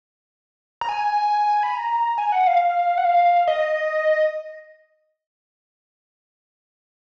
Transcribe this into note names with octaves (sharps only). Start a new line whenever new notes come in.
A#5
G#5
B5
A#5
G#5
F#5
F5
F#5
F5
D#5